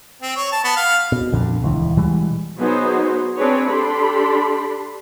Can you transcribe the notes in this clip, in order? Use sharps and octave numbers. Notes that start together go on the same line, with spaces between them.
C4
C#5
A5
B3
F5
B2
A#1 F2 D3
D#1 C#2 E3
B2 E3 G3 G#3
F#3 B3 D#4 F#4 G#4 C5
C4 D4 G#4 B4 C#5
D4 G4 A4 B5 C6